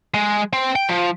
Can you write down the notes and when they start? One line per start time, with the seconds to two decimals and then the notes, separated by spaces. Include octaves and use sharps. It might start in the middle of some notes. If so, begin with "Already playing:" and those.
0.14 G#3
0.53 C4
0.76 G5
0.89 F3